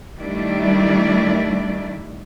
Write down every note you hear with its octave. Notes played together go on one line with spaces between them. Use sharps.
D#3 G3 A3 D4 E4 D5